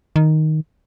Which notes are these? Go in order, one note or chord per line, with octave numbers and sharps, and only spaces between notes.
D#3